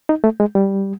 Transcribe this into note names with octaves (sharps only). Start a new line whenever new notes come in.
D#4
A3
G#3
G3